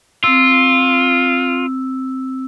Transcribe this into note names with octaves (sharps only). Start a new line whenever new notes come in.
C4 F4 E6